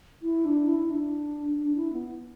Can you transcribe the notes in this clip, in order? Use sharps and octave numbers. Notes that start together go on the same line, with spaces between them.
E4
D4
E4
D4
D4
E4
B3